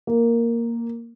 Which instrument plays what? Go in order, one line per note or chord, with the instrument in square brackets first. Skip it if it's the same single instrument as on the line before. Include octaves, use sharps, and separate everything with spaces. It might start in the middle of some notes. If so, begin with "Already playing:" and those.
[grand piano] A#3